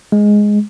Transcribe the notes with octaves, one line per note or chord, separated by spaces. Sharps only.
G#3